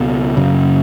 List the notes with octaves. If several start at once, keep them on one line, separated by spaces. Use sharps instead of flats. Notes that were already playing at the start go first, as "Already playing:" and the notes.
Already playing: C#2 B2 B3
F#2 C#3